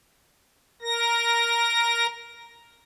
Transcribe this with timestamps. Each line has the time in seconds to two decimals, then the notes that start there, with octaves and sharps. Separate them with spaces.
0.82 A#4 A#6